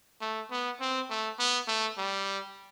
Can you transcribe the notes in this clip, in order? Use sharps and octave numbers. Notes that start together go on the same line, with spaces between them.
A3
B3
C4
A3
B3
A3
G3